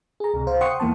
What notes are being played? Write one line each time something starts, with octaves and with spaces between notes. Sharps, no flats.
G#4 A#5
C#2 C3
C#2 C5 F5
F#5 G5 C6 C#6 D#6 C#7
E2 E3 A#3 B3 A5